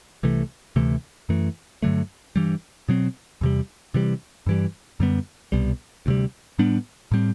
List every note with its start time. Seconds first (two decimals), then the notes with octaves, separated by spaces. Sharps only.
0.23 C2 C3 E3 A3
0.76 D2 C3 E3 A3
1.29 F#2 E3 A3
1.82 G2 D3 F#3 A3
2.36 G2 E3 G3
2.88 B2 F#3 C4
3.41 E2 C3 G3
3.94 C3 E3 G3
4.46 G2 E3 G3
5.00 F#2 D3 G3 B3
5.52 C2 B2 G3
6.06 D2 C3 G3
6.59 A2 G3 B3 D4
7.11 A2 G3 C4